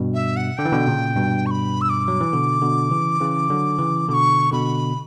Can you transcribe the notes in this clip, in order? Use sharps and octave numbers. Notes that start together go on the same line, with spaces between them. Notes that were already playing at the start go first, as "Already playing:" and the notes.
Already playing: G2 B2
E5
F#5
D3 G5
E3
B2 D3
A#2 C#3
G2 B2
C#6
B5
E6
D6
F#3
E3
B2 D3
B2 D3
C#3 E3
C#3 E3
D3 F#3
C#3 E3
B2 D3 D6
C#6
B2 D3 B5